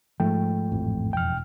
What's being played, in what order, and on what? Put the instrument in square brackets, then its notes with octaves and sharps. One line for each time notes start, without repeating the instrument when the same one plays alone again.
[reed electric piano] G#2 A3 G5 [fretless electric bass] F3
[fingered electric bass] A1 F2
[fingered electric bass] E1 [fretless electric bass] F2 [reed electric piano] G5 F6